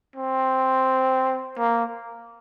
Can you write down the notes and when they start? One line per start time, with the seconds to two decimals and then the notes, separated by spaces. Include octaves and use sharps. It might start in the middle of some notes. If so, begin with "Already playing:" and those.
0.16 C4
1.58 A#3